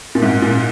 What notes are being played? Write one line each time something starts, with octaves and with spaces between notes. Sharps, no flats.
A#2
G#2
A#2